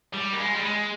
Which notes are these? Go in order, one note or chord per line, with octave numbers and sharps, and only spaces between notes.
G3
A#3
G#3
G3
G#3